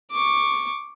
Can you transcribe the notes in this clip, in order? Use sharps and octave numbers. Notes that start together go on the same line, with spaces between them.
C#6 D6